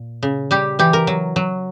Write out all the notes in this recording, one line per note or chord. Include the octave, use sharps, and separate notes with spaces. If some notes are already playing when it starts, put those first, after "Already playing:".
Already playing: A#2
C#3
G3 G4
E3 G4
A#4
F#3
F#3